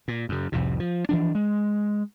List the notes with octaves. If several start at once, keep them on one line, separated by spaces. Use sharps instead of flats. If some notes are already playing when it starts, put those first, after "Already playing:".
A#2
F#2 C#3
C2 F2 A2 C3
F3
E3 F3 D4
G#3